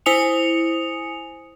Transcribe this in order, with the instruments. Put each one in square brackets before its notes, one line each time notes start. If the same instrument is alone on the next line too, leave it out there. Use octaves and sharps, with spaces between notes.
[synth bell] E4 C5 G#5 D#6 C#7 F7